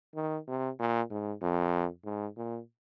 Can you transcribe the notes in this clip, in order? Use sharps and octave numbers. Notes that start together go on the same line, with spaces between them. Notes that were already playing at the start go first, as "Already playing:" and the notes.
D#3
C3
A#2
G#2
F2
G#2
A#2